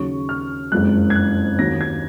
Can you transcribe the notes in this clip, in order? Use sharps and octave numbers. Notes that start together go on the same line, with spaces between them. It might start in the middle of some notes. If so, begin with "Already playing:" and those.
Already playing: D#2 C#3 F#3 C#6
F6
F#1 F2 F3 G#3 F#6
G#6
F#6
D#2 D#3 F#3 A#3 A#6
G#6